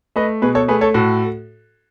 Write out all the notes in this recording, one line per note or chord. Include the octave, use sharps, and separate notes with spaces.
A3 B4 D#5
B2 G#4 B4
A4 C#5
A3 G#4 B4
A4 C#5
A2 F#4 A4